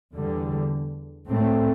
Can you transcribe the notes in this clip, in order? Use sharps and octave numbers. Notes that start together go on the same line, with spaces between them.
E2 D3 G3
A2 A3 C4